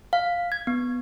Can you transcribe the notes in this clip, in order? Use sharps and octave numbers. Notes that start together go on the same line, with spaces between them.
F5
G#6
B3